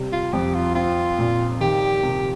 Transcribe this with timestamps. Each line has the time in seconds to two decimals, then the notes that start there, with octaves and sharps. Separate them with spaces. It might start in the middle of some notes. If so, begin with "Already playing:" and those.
Already playing: C3 G3
0.12 F4
0.33 F2 G4
0.55 F4
0.75 C4 F4
1.19 A#2
1.60 D#3 G4
2.03 C3